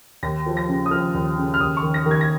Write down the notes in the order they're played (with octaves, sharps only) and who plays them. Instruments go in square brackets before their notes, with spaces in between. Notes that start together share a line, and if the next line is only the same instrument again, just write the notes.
[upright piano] D#2 A#6
F3
A#6
C#3
D#6
F3 F6
D#2
C#3
F6
D#2 D#6
C#6
D#3
A#6
D#3
G#6
A#6